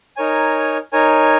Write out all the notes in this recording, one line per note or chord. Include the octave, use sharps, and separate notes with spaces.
D#4 A#4 C#5 G#5
D#4 A#4 C#5 G#5